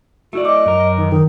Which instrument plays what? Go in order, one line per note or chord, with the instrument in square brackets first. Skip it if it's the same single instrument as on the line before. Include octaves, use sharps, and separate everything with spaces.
[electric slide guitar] A3 E4 D5 [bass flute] F#4
[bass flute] D#5 [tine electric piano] D6
[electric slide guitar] F#2 A#4
[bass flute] D#3
[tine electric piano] D#3 [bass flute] D#4